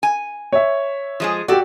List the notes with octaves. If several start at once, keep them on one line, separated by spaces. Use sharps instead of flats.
G#5
C#5 E5
F3 G#3 G#4
F#4 G4 A4 D5